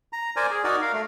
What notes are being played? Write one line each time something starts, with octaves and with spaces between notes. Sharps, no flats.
A#5
A#4 C5 D5 G#5
G#4
D#4 F#4 A#4 D5
A#4 F5
A3